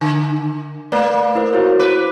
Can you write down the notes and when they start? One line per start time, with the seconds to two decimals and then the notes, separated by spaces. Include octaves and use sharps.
0.01 D3
0.92 A3 A#3 B4 D5
1.35 E4 A#4 C5
1.53 E4 F#4 C#5
1.79 B4 C5 D6